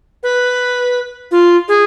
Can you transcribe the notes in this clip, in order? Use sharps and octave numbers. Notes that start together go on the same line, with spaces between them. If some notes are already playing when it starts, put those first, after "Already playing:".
B4
F4
G#4